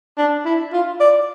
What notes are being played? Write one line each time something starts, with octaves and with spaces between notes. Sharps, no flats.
D4
E4
F4
D5